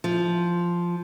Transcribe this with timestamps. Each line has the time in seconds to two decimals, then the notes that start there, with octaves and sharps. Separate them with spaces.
0.04 F3